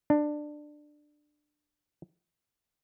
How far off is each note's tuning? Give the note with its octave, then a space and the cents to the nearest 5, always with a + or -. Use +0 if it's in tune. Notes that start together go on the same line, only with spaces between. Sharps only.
D4 +15